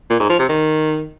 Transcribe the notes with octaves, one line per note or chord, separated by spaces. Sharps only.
A#2
G#2
F3
C3
D#3